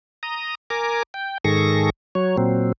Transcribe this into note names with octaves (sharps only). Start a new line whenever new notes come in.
A#5 D#6
A#4 G#5 A#5 D6
G5
G#2 D#3 G#4 A4 C#6 A#6
F#3 C#5
A#2 F#3 C4